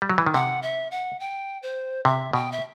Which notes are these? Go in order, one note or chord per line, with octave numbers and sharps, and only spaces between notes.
G3
F#3
E3
D#3
C3 F#5
E5
F#5
G5
C5
C3 E5
B2 G5
E5